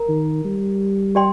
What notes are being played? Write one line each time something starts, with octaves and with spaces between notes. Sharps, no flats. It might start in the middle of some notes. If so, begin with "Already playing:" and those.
Already playing: A#4 A#5
D#3
G3
G4 D5 G5 C6